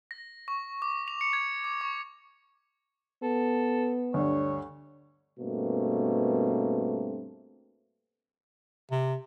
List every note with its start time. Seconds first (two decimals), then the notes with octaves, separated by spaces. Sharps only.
0.11 A#6
0.48 C#6
0.82 D6
1.08 F7
1.21 C#7
1.33 G#6
1.64 D6
1.81 C#6
3.23 B3 A4
4.14 D2 G2 C#5
5.40 G2 B2 A3 A#3 C4
8.91 C3